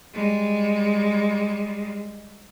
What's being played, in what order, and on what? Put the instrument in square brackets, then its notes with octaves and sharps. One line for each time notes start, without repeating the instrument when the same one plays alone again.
[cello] G3 G#3